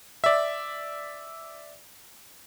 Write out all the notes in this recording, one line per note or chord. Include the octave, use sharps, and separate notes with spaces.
D5 E5